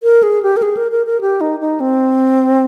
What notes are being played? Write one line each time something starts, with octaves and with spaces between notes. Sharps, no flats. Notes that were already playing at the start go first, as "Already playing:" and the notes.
A#4
G#4
G4
A#4
G#4
A#4
A#4
A#4
G4
D#4
D#4
C4